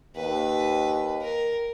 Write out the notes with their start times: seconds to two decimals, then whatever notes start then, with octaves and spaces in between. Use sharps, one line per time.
0.16 D#2 B4
1.22 A#4